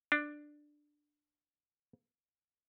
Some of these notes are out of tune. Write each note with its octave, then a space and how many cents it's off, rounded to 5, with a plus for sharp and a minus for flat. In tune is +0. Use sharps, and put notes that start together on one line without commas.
D4 +10